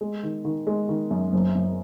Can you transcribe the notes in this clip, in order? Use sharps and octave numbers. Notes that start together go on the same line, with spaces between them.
G#3
D#3
D#3
G#3
D#3
F#2
F#1
F#1